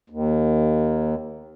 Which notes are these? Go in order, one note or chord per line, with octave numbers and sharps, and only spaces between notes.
D#2